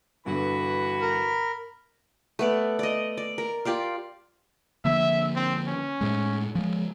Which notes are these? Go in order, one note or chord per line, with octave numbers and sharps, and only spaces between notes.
G2 D3 E3 B3 F#4 B5
A#4
A3 B3 D5
D5 D#5
D5
A#4
F4 G4 D5 F5
D3 F3 A#3 E5
C4
C#4
A2 G#3
F3 G#3